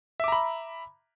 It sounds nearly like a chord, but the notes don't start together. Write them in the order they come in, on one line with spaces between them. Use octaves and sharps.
E5 D6 A#5 B5